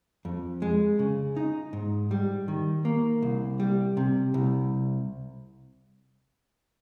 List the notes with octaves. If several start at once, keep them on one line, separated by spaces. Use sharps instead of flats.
F2
G#3
C#3
D#4
G#2
G3
D#3
A#3
C2
G3
C3
C2